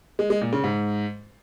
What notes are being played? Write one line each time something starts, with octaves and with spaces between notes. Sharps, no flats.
G#3
G#3
A#2
C#3
G#2